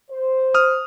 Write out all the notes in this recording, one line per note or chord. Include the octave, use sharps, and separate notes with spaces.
C5
D#6 F6